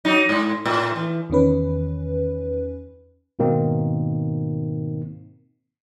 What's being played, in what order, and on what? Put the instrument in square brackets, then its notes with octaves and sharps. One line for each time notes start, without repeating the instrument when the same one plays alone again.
[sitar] F#3 D#4
G#2
A2
E3
[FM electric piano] E2 D#3 C#4 B4
[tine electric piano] G#2 B2 D#3 A#3 C4 D#4